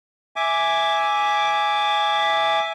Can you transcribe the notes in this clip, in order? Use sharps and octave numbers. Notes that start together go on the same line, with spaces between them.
E5 G#5 D6